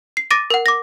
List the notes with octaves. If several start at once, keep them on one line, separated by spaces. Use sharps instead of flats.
C7
D6 A6 A#6 D7 D#7
A#4 F#5
D6 A#6